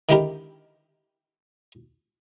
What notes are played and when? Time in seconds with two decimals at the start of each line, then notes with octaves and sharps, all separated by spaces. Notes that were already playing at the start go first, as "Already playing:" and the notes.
0.09 D3 D#3 G#3 E4 G4 A#4